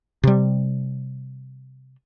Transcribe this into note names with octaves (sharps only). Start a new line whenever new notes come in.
C3 G3